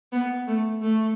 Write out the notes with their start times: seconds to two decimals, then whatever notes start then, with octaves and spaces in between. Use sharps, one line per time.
0.12 B3
0.47 A3
0.82 A3